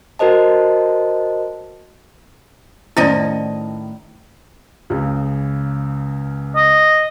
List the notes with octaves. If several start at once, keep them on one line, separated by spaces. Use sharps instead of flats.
F#4 A#4 C5 D#5 A5
A2 D#3 F3 C#4 D#4 E4 D5 D#5
C#2 C#3
D#5